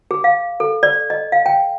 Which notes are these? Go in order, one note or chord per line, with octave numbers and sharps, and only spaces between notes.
G#4
F5
A4
D5
D#5
F5
G5